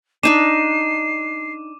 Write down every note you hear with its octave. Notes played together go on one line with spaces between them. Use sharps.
D4 D#4 D#5 D6 C7 D#7 E7